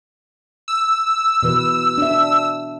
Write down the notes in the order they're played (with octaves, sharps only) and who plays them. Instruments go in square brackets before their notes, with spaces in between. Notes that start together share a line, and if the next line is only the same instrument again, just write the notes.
[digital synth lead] E6
[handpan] B2 E3 B4
D4 E5